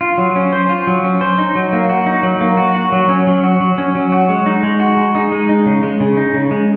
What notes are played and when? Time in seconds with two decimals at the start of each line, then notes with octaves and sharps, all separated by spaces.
0.01 F4
0.18 F#3
0.36 C#4
0.53 C5
0.69 F4
0.87 F#3
1.04 C#4
1.21 C5
1.38 D#4
1.55 F#3
1.73 A#3
1.89 F#4
2.06 D#4
2.23 F#3
2.41 A#3
2.57 F#4
2.75 F#4
2.92 F#3
3.09 C#4
3.27 F#3
3.44 F#4
3.60 F#3
3.78 C#4
3.95 F#3
4.12 F#4
4.29 G#3
4.46 D#4
4.63 G#3
4.80 F#4
4.97 G#3
5.15 D#4
5.32 G#3
5.49 D#4
5.66 C#3
5.83 G#3
6.00 C#3
6.17 D#4
6.34 C#3
6.51 G#3